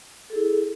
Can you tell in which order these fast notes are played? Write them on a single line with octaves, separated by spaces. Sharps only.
A4 G#4 E4